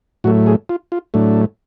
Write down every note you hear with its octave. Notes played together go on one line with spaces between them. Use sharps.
A2 F#3 A3 F#4
G#4
F4
F4
A2 F#3 A3 D4